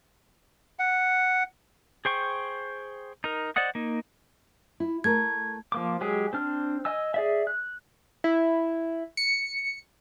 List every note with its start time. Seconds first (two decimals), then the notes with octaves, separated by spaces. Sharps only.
0.79 F#5
2.05 G#4 C5 G5 C#6
3.24 D#4 A#4
3.56 C5 D5 D#5 F#5 D#6
3.75 A#3 D#4
4.80 E4
5.04 A3 A4 A#4 G#6
5.72 F3 A#3 D6
6.01 F#3 G#3 G4 G#4
6.33 C4 D4 F6
6.85 D#5 G#5 E6
7.14 G#4 D5 E5
7.47 F#6
8.24 E4
9.17 C#7